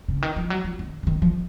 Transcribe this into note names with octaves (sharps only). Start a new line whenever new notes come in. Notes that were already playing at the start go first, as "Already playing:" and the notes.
C#3
D#3
F3
F#3
F3
D#3
C#3
D#3
F3